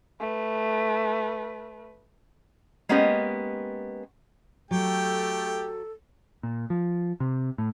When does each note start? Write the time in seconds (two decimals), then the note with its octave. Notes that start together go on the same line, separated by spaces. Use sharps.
0.20 A3 B4
2.89 G#3 A#3 B3 C#4 G4 D#5
4.71 F#3 A3 G4 A4 G5
6.43 A#2
6.70 F3
7.20 C3
7.58 A2